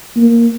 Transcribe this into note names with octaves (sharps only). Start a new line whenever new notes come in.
A#3